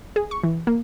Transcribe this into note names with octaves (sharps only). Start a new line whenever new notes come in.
G#4
C#6
E3
A#3